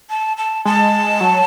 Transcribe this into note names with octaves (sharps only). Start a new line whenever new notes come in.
A5
A5
G#3 A5
F#3